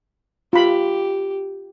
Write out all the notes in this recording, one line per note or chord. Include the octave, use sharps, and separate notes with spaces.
F4 G4 B5